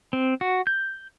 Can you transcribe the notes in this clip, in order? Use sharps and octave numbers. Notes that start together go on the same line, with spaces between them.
C4
F#4
G6